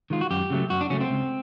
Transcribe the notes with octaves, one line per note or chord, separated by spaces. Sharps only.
D#3 G#3 F4
F#4
F#2 G4
C#3 F#3 A3
F#2 F#4
D4
C#3 F#3 A3 C#4
C4
C#2